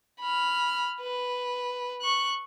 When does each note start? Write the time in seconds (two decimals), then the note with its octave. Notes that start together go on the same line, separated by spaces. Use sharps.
0.21 B5 F6
1.01 B4
2.02 C#6 F#6